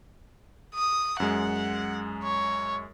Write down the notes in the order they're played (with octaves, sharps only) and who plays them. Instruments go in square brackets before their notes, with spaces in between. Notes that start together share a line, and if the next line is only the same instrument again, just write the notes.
[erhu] D#6
[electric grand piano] F#2 G#3 [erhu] F#5
[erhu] C#5